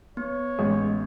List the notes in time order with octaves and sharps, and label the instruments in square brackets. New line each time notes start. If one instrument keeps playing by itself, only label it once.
[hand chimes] B3 [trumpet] C#5
[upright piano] A1 [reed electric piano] G#3